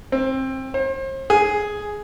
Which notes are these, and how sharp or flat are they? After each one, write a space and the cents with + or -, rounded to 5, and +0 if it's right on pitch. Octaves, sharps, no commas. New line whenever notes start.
C4 +20
C5 +40
G#4 +5